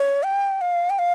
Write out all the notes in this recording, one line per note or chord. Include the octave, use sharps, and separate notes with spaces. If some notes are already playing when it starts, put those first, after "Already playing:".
Already playing: C#5
G5
F5
G5
F5